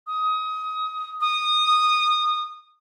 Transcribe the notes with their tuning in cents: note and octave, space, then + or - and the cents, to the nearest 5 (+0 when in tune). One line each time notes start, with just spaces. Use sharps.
D#6 +25
D#6 -20